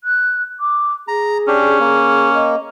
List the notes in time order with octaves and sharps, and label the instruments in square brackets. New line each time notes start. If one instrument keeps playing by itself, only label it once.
[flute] F#6
D6
[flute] G#4 [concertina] A#5
[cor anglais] C#4 [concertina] D4 G4
[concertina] A#3
[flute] D#5